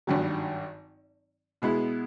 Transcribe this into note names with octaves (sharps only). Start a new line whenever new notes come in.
G#1 G2 D#3 F#3
B2 G#3 B3 E4